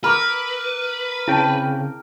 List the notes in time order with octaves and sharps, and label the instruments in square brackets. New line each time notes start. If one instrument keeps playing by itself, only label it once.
[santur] A#4 D6 E6 [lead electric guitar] B4 [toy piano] B5
[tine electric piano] C#3 C4 G5 [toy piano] E4 A5